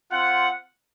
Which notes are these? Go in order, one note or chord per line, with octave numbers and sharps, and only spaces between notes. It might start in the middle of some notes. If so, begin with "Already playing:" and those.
C4 F4 F#5